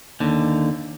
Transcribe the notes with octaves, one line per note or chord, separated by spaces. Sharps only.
D#2 D3